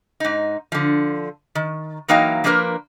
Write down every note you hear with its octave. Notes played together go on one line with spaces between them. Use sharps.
G#2 D#4
D3 F3
D#3
E3 F#3 A#3 D#4 F5 G5
F3 A#3 D4 G#4 A#4 B4